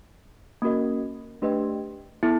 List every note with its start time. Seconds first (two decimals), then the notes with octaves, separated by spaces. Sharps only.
0.62 A#3 C#4 F#4 A#4 D#5
1.42 A3 D4 G4 B4 D#5
2.23 B3 E4 A4